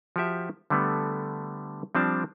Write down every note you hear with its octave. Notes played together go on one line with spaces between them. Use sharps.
F3 F#4 G4 E5
D3 G3 A3 B3
F3 G3 C4 D4 A5